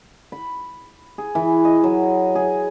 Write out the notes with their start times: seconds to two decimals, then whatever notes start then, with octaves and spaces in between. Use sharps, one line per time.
0.32 B5
1.18 G#4
1.35 E3
1.65 D#5
1.84 F#3
2.35 G#4